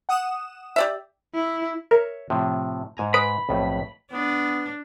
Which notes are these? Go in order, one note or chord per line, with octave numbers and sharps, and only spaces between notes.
F#5 D#6 E7
G4 D5 E5
E4
A#4 C#5 E5
A2 C3 F3
G#2 G#5 A#5
B4 B5 D#6 D7
B1 F2 A2
B3 D4